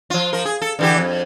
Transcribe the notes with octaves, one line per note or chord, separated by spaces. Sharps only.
F3 F4
F3 A#4
G#4
A4
D3 E3 G4
F2